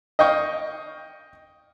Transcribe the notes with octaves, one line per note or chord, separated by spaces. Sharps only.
D#5 F5 G5 C#6